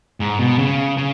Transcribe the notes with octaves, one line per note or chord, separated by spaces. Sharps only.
G#2
B2
C#3
C#3